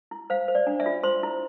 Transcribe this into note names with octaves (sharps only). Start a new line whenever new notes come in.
E4
C5 F5
C5
D5
D4
E5
F4
C5 C6
E4